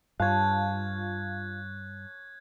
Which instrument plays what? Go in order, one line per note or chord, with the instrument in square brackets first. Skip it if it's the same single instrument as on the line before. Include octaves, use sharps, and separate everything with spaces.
[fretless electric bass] G2 [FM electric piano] F4 F5 [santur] C#5 A5 [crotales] F#6 G#6